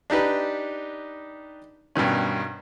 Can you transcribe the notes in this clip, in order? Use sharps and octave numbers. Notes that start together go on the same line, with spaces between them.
D4 D#4 G4 B4
G2 B2 D#3 C#4